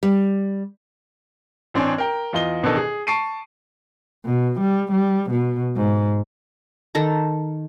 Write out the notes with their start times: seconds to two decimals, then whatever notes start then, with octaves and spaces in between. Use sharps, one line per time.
0.03 G3
1.74 A1 C4 D4 C#5 G#5
1.98 A#4 G5
2.33 E2 F4 D#5 G7
2.63 A1 B2 D#3 D4 A4 D#5
2.77 G#4
3.07 A5 C#6 C7 D7 D#7
4.25 B2
4.60 G3
4.92 G3
5.31 B2
5.76 G#2
6.95 D#3 A4 A#5